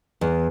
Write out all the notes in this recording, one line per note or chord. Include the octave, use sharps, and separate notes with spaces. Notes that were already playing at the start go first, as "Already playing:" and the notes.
E2